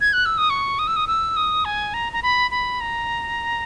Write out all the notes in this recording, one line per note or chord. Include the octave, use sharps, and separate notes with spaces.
G#6
F#6
E6
D#6
C#6
D#6
E6
D#6
E6
D#6
G#5
A#5
A#5
B5
B5
A#5